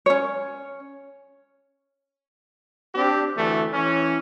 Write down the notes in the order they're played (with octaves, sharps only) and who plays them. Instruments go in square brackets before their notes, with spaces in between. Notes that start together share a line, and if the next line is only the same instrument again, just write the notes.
[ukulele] C#4 C#5
[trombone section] C4 D4 G4
D2 E3 A3
E3 C#4